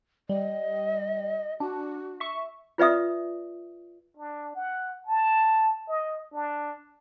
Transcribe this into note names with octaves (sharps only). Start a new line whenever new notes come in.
G3 D#5
D4 F#4
E5 C#6
F4 B4 D5 E5 D#6
D4
F#5
A5
D#5
D4